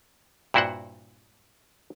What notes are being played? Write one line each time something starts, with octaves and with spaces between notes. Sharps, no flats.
G2 A#2 E4 F#4 C5 F#5